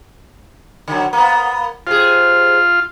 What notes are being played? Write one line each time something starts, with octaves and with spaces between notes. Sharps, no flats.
D3 F#3
A#3 B3
C3 F4 G#4